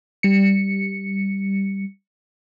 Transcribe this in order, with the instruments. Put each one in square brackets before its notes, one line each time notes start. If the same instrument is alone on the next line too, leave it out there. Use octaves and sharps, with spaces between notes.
[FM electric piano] G3 C#7